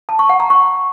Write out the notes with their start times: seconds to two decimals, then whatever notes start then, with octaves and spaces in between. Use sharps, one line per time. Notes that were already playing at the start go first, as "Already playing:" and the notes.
0.09 A5
0.19 C#6
0.29 F#5
0.40 A#5
0.50 C#6